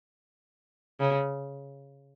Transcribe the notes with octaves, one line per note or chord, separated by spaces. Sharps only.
C#3